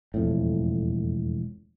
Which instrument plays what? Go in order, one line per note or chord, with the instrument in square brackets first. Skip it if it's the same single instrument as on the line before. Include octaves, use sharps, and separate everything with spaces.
[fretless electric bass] E1 F2 A2